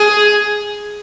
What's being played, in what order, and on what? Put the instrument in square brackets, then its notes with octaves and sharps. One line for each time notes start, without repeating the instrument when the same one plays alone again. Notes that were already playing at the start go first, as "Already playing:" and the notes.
Already playing: [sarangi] G#4